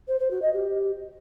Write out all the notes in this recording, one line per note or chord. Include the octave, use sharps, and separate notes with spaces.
C5
C5
F#4
D#5
G4